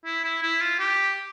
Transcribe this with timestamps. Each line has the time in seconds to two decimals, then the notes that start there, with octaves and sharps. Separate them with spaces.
0.05 E4
0.24 E4
0.43 E4
0.61 F4
0.79 G4